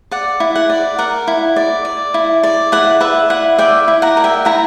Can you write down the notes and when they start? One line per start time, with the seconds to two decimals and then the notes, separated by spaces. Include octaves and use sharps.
0.11 D5 F#5
0.40 E4
0.55 F#5
0.70 D5
0.99 A#4 F#5
1.28 E4
1.56 D5
1.85 D5
2.14 E4
2.43 D5
2.72 E4 F#5
3.01 B4 E5
3.30 E4 F#5
3.58 D5 E5 G5
3.88 E4
4.02 F#5 A#5
4.17 A#4
4.24 E5 G5
4.45 E4 F#5 A#5